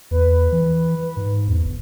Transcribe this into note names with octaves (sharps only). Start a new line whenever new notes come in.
E2 B4
E3
G#2
E2
G1